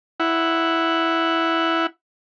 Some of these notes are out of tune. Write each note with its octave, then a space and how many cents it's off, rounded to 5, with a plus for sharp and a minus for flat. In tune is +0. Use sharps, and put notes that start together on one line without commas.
E4 +0 F#5 +0